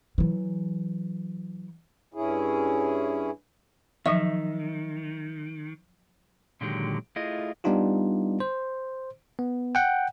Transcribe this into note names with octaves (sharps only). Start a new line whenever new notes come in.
E3 F#3
G2 C#4 E4 G#4
D#3 F3 F#3 D#5 E5 C#6
A#2 D3 D#3 F#3 G#3 G4
A3 E4 F4 G#4 D#5
G3 B3 D4 D#4 F4 G4
C5
B3
F#5 G5